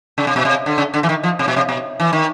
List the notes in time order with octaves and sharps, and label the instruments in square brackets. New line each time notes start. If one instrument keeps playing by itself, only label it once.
[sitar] C#3
C3
B2
C3
D3
C#3
D3
E3
D#3
F3
C3
B2
C3
B2
E3
D#3